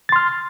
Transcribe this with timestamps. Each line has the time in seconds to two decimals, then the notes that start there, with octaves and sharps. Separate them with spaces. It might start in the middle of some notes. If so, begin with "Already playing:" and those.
0.09 A6
0.12 C6
0.16 F6